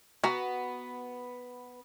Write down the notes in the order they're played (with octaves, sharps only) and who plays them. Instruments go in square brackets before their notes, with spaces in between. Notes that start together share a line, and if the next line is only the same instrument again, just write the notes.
[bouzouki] B3 [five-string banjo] F#4 A#5